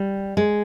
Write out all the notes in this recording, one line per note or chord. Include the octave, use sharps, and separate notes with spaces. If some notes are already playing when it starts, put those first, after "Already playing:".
Already playing: G3
G#3